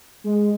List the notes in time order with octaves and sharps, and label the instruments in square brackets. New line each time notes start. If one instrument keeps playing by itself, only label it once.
[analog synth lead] G#3